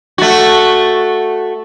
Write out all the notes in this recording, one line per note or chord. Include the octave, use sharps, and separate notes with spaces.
A3 F#4